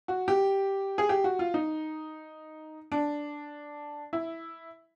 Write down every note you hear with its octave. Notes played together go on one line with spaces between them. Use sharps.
F#4
G4
G#4
G4
F#4
F4
D#4
D4
E4